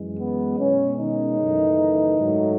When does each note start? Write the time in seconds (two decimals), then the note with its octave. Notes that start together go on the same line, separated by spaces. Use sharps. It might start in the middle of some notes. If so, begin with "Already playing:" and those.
Already playing: F#2 E3 G#3
0.19 B3
0.59 B2 G#3 C#4
0.98 D#3 D#4
1.39 F#2 C#3 E3 A3
2.18 G#2 F#3 A3